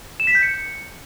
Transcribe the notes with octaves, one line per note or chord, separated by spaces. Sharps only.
E7
B6
G6
C#7